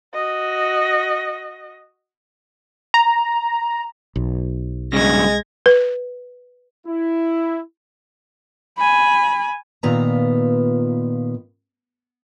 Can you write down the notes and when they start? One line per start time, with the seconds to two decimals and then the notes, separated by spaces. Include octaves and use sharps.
0.14 F#4 D#5
2.94 A#5
4.16 B1
4.93 G2 C#3 G#3 G#6 A#6
5.66 B4
6.87 E4
8.78 G#5 B5
9.83 A#2 D#3 B3 F4 B4 A#5